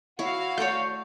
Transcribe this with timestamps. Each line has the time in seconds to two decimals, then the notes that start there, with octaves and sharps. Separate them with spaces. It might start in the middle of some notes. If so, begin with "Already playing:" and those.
0.19 E4 F#4 C#5 F5
0.58 A3 C#5 D5 G6